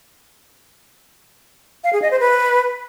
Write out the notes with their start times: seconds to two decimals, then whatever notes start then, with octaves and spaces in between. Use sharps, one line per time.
1.84 F5
1.93 G#4
2.02 D#5
2.11 C5
2.20 B4